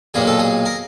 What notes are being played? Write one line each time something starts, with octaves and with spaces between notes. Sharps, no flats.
B1 A#2 G3 A#3 G#4
A4
G#4
A#4